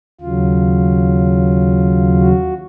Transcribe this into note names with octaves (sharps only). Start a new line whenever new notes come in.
D#2 C#3 F#3 F4
F#4